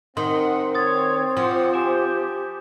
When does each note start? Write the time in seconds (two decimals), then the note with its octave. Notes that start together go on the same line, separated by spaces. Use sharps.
0.17 D#3 C4 F#5 C6
0.75 C#5 D#6 A6
1.37 F3 F#5 C6 D6
1.73 G4 G#5 D6 E7